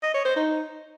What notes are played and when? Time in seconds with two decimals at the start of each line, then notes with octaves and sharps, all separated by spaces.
0.03 D#5
0.14 C#5
0.25 C5
0.36 D#4